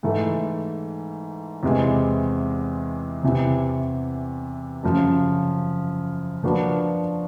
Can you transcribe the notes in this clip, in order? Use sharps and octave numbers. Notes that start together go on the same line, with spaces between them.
G#2 E3 A3
E2 C3 E3 G#3 C4
E2 C3 E3
F#2 C#3 F3
F3 A#3 D4 F#4 B4